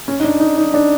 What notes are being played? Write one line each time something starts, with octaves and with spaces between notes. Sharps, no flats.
C#4
D#4
D4
D#4
D#4
D4